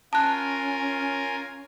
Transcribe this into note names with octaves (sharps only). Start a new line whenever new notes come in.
C#4 F4 A#4 G#5 A5 F#6